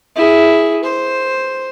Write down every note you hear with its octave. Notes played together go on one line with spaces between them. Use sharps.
E4 G#4
C5